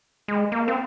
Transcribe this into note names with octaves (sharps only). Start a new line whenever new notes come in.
G#3
A#3
C4